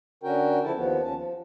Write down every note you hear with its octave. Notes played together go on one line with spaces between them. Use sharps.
D3 C#4 F#4 A#4 G5
C#3 F3 E4 A4 A5
D#2 F3 B3
D#2 C#4 A5
F3